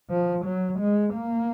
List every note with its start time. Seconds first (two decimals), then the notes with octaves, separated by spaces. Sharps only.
0.10 F3
0.45 F#3
0.80 G#3
1.14 A#3